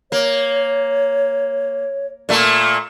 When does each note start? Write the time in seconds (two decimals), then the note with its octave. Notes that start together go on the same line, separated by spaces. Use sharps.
0.12 A#3 C#5
2.29 A#2 A3 A#3